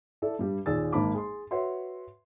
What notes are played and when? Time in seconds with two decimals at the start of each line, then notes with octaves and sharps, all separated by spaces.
0.22 E4 A4 D5 A5
0.39 G2 G3 G4
0.66 D#2 A#2 G#4 D5 E6 A6
0.93 G#1 G#2 A#3 A5 B5 D6
1.14 G#4 C6
1.51 F#4 B4 C#5 E5 C6